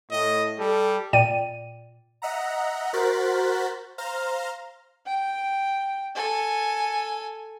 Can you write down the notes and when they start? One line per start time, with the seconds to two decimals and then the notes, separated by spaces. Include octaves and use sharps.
0.11 A2 D#5
0.59 G3 A4
1.13 A#2 D5 G5 D#7
2.22 D#5 E5 F#5 A#5
2.93 F#4 A#4 C5 F#6 A6 B6
3.98 C5 F5 A#5 F6
5.06 G5
6.15 A4 G#5